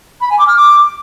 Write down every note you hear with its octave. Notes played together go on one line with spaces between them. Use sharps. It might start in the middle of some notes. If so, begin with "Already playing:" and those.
B5
G#5
D6
F6
D6